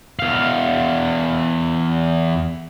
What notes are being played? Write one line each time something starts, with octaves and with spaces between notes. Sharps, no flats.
E2 F5